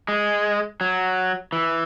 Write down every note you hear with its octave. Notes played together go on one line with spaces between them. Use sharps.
G#3
F#3
E3